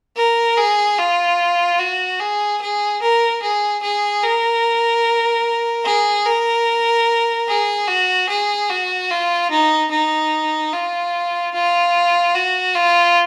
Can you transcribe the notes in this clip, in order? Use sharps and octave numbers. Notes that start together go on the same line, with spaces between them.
A#4
G#4
F4
F#4
G#4
G#4
A#4
G#4
G#4
A#4
G#4
A#4
G#4
F#4
G#4
F#4
F4
D#4
D#4
F4
F4
F#4
F4